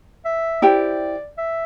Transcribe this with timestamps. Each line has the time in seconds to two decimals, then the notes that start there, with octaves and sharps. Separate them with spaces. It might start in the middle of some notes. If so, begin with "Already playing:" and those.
0.25 E5
0.62 E4 G4 C5 D5 G5
1.38 E5